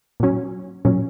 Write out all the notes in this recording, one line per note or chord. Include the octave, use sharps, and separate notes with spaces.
A#2 F#3 C#4
A#2 F#3 C#4